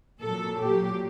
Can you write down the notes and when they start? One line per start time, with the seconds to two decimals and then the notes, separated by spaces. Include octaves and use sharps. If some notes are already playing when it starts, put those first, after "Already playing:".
0.20 A#2 F#3 A4
0.60 A#2 F#3 G4